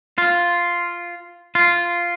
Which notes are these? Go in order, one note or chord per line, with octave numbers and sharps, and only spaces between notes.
F4
F4